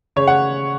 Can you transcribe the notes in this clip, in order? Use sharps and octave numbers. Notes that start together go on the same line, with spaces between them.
C#3 C#5
F#5